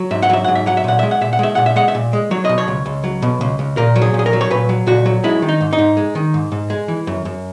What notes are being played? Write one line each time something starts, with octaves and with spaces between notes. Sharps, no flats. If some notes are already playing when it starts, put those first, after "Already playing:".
Already playing: F#3
G#2 E5
F#5
F#3 E5
G#2 F#5
E5
F#3 F#5
E5
A#2 F#5
G#3 E5
F#5
A#2 E5
F#5
G#3 E5
A#2 F#5
E5
G#3 F#5
E5
A#2
G#3
F#3 C#5
B2 D#5
C#5
C#2
C#2
F#3
B2
C#2
C#2
A#2 A#4
F#3
G#4
A#2 G#4
A#4
F#3
C#5
A#2 B4
F#3
A#2 F#4
F#3
G#3 E4
D#3
D#4
G#2
D#4
G#2
G#3
D#3
G#2
G#2
G#3
E3
F#2
F#2